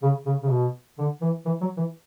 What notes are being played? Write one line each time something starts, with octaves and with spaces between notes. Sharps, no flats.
C#3
C#3
C#3
B2
D3
E3
E3
F#3
E3